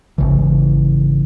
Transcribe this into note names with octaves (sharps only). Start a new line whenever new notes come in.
G#1 D2 C#3 E3